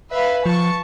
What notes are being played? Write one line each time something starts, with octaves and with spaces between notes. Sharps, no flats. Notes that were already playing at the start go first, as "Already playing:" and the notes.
B4 E5 F5
F3 A5 C#6